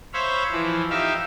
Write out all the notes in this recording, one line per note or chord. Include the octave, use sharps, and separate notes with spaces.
C5 C#5 E5 F5 B5
E3 F3
D#4 G4 E5 F5